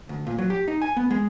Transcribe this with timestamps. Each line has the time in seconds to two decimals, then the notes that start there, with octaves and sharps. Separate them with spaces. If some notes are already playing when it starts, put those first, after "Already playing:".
0.09 D2
0.27 A#2
0.38 F#3
0.50 G4
0.68 D#4
0.82 G#5
0.97 B3
1.11 G#3